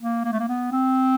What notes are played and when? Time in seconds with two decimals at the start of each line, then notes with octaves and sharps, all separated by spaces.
0.01 A#3
0.24 A#3
0.32 A3
0.39 A#3
0.49 B3
0.72 C4